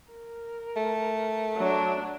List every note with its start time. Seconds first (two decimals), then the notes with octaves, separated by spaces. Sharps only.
0.12 A#4
0.76 A3
1.57 F#3 D4